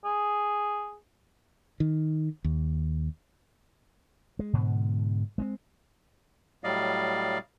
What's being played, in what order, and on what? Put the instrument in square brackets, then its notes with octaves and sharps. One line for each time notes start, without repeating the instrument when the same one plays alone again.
[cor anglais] G#4
[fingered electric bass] D#3
D#2
[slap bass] G#3
G#2 B2 D3
G#3 B3 C4
[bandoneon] A2 F#3 G3 D5 D#5 F5